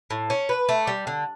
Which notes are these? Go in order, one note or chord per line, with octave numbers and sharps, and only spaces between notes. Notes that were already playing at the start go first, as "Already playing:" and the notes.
A2
C#4
B4
A3
G3
D3